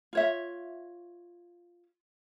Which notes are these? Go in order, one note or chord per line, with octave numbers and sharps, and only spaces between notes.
F4 C#5 E5